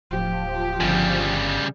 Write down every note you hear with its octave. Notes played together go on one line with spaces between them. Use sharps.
D1 F3 G4
G1 C#3 G3